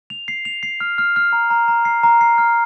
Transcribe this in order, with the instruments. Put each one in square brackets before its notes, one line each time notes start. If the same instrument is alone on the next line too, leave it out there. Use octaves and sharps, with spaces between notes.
[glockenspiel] F7
C7
F7
C7
F6
F6
F6
A#5
A#5
A#5
C7
A#5
C7
F6